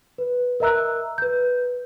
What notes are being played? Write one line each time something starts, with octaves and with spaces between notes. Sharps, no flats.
B4
A#4 D#5 E5 A#5 E6 F#6
B4 G6